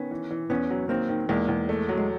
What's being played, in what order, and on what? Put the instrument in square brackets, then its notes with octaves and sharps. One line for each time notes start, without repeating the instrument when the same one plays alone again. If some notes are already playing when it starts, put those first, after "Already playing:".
Already playing: [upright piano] D#3 [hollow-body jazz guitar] B3 C#4
[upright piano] E3
E3
[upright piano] E2 [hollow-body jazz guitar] B3 C#4
[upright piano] F#3
[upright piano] D#3 [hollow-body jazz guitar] A#3 C4
[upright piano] D#3
[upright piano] E2 [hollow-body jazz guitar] G#3 A#3
[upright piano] E2
A3
F#3
[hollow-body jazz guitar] G#3